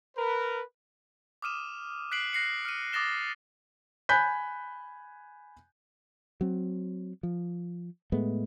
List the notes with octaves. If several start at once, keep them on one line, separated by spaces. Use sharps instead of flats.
A#4 B4
D6 D#6 F6 D#7 E7
F#6 B6 C7 D7 F#7
F#6 A#6 C7 C#7
F6 D#7
D6 D#6 A6 A#6 E7 G7
G#5 B5 F#6 G6 B6
F#3 C4
F3
A2 G#3 A3 B3